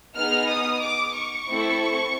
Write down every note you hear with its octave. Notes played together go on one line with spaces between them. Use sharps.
B3 D#4 G#4 F6
D#6
D6
C#6
A3 C4 E4 A4